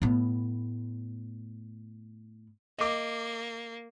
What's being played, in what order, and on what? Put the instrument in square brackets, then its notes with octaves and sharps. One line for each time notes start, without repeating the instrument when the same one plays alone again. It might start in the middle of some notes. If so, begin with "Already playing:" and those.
[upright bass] A2 B3
[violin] A#3 [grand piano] D#5 D6